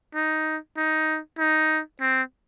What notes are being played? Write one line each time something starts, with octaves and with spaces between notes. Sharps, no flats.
D#4
D#4
D#4
C4